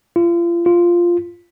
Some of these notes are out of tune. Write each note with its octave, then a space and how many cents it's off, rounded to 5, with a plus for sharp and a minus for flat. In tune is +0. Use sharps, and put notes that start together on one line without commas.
F4 -35
F4 -5